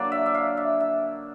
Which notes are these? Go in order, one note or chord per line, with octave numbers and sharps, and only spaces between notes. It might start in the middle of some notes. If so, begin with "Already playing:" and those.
Already playing: D3 F#3 A#3 D4 D5
E5
E5
F5
E5
E5